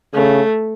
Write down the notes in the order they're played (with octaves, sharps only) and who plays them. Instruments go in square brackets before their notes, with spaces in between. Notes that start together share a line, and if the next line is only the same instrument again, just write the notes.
[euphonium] C#3 [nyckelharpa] A3